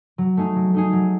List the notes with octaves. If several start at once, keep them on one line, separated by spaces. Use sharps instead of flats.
F#3
A3 D#4 G#4
F#3
A3 D#4 G#4
F#3